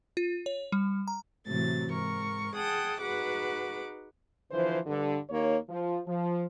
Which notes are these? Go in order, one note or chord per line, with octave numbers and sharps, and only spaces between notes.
F4
C#5
G3
A#5
A2 C3 E3 F#3 A6
G#2 A#4 C#6
G#4 F#5 G5 A5 D#6
D#4 F#4 G#4 B4 F#5 D6
D3 E3 F3 C5
G2 D3
D#2 A#3 D#4 C#5
F3
F3